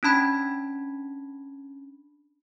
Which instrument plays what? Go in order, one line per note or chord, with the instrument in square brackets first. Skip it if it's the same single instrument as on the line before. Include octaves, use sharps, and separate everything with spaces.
[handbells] C#4 D4 A5 B5 G#6 B6